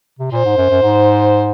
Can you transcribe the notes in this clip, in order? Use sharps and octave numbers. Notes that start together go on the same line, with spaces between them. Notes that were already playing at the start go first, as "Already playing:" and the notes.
C3
A#2 C5
G#2
F#2
F#2
G#2